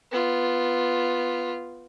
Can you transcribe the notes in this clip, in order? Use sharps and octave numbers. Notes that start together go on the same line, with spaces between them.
B3 F4